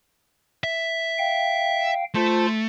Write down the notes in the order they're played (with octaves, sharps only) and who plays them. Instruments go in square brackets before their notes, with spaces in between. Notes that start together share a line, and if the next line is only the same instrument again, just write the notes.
[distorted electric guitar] E5
[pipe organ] F5 G5
[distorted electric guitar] A3 [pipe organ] F4 C5 A5